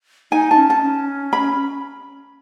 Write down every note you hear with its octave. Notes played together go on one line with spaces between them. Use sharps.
D#4 G#5
A5
C#4
A5
C#4
B5